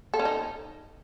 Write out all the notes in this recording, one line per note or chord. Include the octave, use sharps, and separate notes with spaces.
A4
C#4
D#4